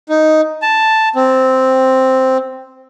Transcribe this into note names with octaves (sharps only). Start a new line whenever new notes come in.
D#4
A5
C4